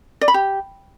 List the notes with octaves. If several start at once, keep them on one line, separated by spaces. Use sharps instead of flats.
D5
B5
G4